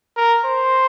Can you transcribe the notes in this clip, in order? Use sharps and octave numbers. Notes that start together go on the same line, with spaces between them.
A#4
C5